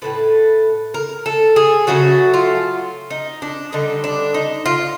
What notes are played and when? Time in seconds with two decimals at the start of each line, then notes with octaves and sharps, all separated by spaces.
0.02 A2 E3 A3 B4
0.94 A#4
1.26 A4
1.56 G#4
1.87 C#3 F#3 A3 F#4
2.34 F4
3.10 D#4
3.42 D4
3.72 D3 G3 D#4
4.04 D4
4.34 D#4
4.66 F4